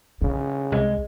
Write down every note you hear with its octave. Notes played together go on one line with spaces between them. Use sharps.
C#3 D4
C2 G#3